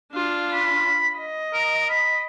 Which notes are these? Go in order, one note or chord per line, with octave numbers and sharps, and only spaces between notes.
D4 F4
B5
D#5
A#4
B5